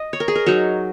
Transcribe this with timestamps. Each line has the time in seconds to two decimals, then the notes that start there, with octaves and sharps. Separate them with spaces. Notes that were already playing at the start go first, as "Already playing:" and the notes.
Already playing: D#5
0.13 C#5
0.20 A#4
0.28 G#4
0.35 A#4
0.46 F#3 D#4 C#5